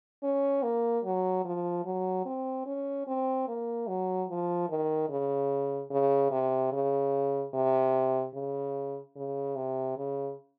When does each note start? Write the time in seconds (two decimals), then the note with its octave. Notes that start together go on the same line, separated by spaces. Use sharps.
0.23 C#4
0.63 A#3
1.04 F#3
1.45 F3
1.85 F#3
2.25 C4
2.66 C#4
3.07 C4
3.48 A#3
3.88 F#3
4.29 F3
4.70 D#3
5.09 C#3
5.91 C#3
6.31 C3
6.72 C#3
7.54 C3
8.34 C#3
9.16 C#3
9.56 C3
9.97 C#3